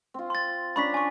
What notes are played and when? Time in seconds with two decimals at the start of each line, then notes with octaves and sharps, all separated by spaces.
0.14 C4 F4
0.30 C6 A6
0.76 C#4 D4 A#5 B5 C#6 B6
0.94 G#5 C#6